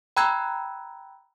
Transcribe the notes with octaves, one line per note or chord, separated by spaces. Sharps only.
G5 A#5 B5 E6 F#6 G#6